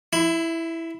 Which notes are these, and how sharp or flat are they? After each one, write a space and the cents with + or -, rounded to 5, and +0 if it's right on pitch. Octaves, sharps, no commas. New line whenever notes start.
E4 +0 B5 +35